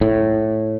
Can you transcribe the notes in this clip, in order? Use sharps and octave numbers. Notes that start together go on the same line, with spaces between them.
A2